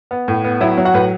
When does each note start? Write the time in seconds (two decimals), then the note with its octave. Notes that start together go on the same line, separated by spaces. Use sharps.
0.11 B3
0.28 A2
0.44 B3
0.61 F#3 E4 E5
0.78 F#3
0.85 F#4 F#5
0.94 A2 B4